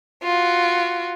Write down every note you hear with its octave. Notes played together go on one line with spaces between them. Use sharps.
F4 F#4